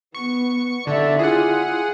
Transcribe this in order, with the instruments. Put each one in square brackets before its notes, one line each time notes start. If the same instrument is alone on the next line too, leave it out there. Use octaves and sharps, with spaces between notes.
[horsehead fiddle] B3 [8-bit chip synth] C#6 C#7
[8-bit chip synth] D3 [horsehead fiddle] D5 E5
[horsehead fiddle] E4 F4 [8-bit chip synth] G#4 F#5